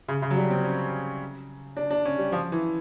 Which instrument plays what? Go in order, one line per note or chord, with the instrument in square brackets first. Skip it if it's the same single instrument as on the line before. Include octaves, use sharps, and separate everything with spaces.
[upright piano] C#3
C#3
F#3
G3
C4
C#4
D4
D4
C#4
G3
F3
E3